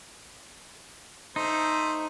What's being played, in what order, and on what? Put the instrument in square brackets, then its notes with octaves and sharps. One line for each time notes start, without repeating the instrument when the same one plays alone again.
[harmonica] A3 C5 [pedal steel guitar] D#4